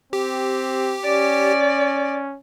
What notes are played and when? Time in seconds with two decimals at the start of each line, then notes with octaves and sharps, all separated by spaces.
0.13 C4 G4
1.04 C#4 D5